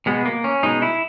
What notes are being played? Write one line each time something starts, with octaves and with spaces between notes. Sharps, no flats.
B2 G#3 B3
A#3
C#4
B2 G#3 D#4
E4